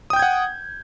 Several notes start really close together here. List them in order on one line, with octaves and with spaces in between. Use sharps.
D#6 G5 G6 G#6 F#5